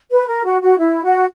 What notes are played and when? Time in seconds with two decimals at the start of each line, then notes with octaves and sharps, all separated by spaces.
0.10 B4
0.27 A#4
0.44 F#4
0.61 F#4
0.78 E4
1.03 F#4